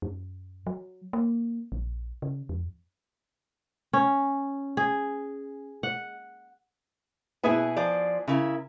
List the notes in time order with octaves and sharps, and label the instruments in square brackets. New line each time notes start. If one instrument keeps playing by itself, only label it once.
[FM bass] F#2
F#3
A#3
A#1
C#3
F2
[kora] C#4
G#4
F#5
[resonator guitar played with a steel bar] B2 E5 G#5 [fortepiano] B3 E4 G#4
[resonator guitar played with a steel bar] F3 C5 D5
C#3 E4 A#4